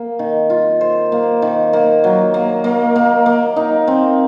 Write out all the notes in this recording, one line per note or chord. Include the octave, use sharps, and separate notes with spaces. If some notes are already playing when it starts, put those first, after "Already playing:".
Already playing: A#3
D#3
F4
C5
A#3
D#3
A#3
F#3
A#3
A#3
A#3
A#3
D#4
C4